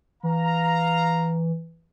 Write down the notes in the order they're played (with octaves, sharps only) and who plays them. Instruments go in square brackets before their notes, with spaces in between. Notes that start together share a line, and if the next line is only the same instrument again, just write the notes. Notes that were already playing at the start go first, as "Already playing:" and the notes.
[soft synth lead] E3 [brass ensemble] F5 A#5